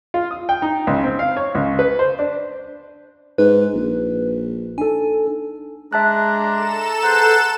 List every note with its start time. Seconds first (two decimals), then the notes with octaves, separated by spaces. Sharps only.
0.14 F4
0.31 D#6
0.49 G5
0.62 D#4
0.87 C#2
1.03 C4
1.19 F5
1.37 C#5
1.55 C#2
1.79 B4
1.99 C5
2.19 D4
3.38 G#2 B4
3.75 A#1
4.78 D4 D#4 A4 G#5
5.93 G#3 D4 E5 A5 A#5 F#6
6.51 A4 E7
7.03 G#4 B4 C5 F#5 A#5